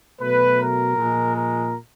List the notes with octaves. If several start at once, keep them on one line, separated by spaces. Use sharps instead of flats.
B2 F#3 A3 B4
A#4
A#2 F3 G#3
A#4